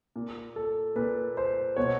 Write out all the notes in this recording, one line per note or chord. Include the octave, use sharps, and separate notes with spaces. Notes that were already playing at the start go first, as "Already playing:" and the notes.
A#2
A4
A#2 B4
C5
B2 C#5